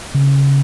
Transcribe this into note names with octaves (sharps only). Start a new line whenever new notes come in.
C#3